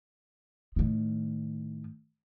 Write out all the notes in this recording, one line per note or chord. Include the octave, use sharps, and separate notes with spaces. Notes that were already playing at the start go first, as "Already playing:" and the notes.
A2 D#3